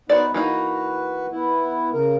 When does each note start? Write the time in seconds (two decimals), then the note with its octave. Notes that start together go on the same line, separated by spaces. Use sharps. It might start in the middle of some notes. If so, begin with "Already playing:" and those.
0.09 B3 D#4 F#4 B4 C5 D5
0.34 E3 A#3 D#4 F#4 B4
1.31 B3 E4
1.93 C#3 A#4